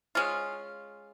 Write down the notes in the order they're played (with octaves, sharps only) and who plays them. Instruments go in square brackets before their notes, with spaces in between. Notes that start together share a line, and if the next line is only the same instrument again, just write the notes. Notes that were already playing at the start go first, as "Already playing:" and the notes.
[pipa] G#3 C#4 F4